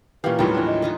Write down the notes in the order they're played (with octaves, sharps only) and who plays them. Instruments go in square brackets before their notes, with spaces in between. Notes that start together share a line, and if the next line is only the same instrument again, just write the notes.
[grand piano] A#2 F5 [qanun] E3 A#3 [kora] C#4 G4 [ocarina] B4
[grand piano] D#2 A2 F#3 [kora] D#3 G3 A3 [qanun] F4 A#4
[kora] E3 D4
[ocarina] D#5
[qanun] D#4 F4 B4